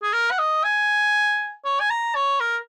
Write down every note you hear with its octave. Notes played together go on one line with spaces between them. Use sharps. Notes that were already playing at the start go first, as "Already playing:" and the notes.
G#4
A#4
F#5
D#5
G#5
C#5
G#5
A#5
C#5
A#4